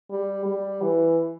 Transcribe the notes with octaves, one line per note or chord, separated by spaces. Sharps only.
G3
G3
E3